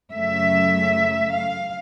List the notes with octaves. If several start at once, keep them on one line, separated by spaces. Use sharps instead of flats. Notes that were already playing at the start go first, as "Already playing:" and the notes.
F#2 C#3 F#3 A3 E5
F5